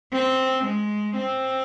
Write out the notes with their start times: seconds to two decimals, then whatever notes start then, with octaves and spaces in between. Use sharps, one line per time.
0.12 C4
0.64 G#3
1.15 C4